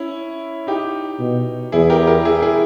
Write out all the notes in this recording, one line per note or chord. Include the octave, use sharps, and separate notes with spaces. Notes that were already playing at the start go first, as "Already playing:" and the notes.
Already playing: C#4 E4
D#4 G4
B2
E2 E4 G#4
G4 A#4
G4 A#4
E4 G#4
E4 G#4